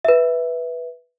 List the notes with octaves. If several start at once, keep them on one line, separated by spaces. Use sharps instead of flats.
B4 E5